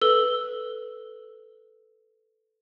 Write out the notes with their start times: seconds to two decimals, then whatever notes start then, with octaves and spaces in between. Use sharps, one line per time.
0.01 A4 B4 E6 G7